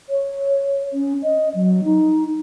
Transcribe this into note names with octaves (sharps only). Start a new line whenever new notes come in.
C#5
C#4
D#5
F#3
D#4